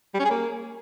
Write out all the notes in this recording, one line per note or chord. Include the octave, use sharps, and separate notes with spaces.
G3
C#4
G#4
A#3